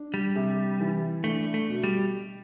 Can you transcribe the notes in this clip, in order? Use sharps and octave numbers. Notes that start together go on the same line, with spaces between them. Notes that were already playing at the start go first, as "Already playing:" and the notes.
Already playing: D4
G3
C3
E3
A3 D4
A3
B2
G3